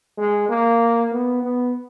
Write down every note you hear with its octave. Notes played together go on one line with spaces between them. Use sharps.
G#3
A#3
B3
B3